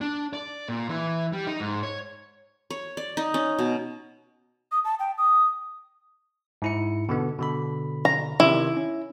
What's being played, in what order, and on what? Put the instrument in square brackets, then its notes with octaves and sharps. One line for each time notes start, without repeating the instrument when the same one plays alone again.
[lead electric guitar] D4
D5
A#2
E3
G3
D#4
G#2
C#5
[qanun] C#5
D5
D#4
C#4
B2
[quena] D#6
A5
G5
D#6
[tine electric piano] G#2 E4 C#7
B2 D3 B3
B2 D3 B5
[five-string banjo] A#5
[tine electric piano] C3 D#3 [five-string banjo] E4
[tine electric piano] C#4